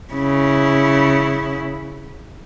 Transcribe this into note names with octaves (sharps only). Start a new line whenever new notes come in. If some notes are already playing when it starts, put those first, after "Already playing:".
C#3 E4